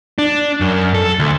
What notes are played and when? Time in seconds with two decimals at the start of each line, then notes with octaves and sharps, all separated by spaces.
0.19 D4
0.61 F#2
0.94 A4
1.19 D2